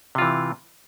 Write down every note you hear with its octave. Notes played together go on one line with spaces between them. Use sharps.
C3 E3 F4